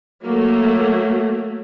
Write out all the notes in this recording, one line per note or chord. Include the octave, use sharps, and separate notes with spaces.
F#3 A3 A#3